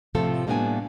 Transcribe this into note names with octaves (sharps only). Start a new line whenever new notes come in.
A2 C3 F3 A3 F4 A4
A2 G3 A#3 B3 D4 G#5